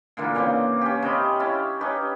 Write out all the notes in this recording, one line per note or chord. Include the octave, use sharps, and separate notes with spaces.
A#2 D3 E3 A#3
C#3 E3 A#3 C4
C#4 G4
C3 C5 D#5 B5
C#4 E4 F5 A5
C#4 D#4 G4 B4